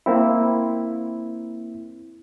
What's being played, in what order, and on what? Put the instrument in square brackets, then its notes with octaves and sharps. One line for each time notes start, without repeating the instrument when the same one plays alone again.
[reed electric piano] A#3 C4 E4